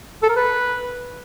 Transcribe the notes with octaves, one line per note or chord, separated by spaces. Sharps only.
A4
A#4
B4